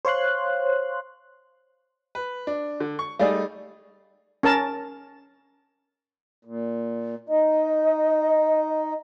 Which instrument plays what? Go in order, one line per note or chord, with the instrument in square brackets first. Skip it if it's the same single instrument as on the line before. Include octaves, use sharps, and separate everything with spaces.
[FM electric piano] C5 C#5 F5 C6 F#6
[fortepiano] B4
D4
D3
C#6
[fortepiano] G3 A3 D#4 [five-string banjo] G#4 D5 F5
[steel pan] C#4 A#4 A5
[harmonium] A#2
[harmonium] D#4 [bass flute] D#5